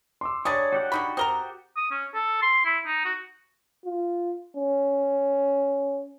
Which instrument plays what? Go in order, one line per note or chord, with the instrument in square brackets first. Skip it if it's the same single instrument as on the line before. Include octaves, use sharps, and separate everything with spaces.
[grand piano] C6 D6 E6
[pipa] G3 G#3 D4 [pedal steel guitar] C#5 [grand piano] D#6 A6
[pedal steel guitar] F#4 G4 F#5 [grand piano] C#5
[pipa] D3 D#4 B5 [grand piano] C#6
[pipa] C4 A#4 A#5 [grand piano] D#6 G7
[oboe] D#6
C#4
A4
C6
E4
D#4
F#4
[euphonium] F4
C#4